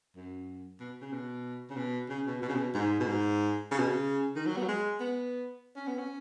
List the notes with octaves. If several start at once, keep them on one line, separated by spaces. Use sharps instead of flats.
F#2
B2
C#3
B2
C#3
B2
C#3
B2
B2
C#3
B2
G#2
B2
G#2
C#3
B2
C#3
D#3
F#3
B3
F#3
G#3
B3
C#4
B3
C#4